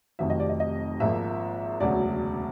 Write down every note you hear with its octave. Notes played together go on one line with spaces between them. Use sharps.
F1 F2 C3 D#3 F#3 E5
D#5
D5
D#5
D#5
G#1 G#2 F3 A#3 E5
E1 D2 C#3 F#3 D5